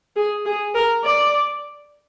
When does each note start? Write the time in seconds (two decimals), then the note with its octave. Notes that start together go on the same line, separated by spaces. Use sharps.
0.16 G#4
0.46 G#4
0.75 A#4
1.04 D5